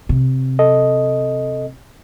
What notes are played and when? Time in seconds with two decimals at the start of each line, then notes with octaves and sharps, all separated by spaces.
0.09 C3
0.59 A4 D#5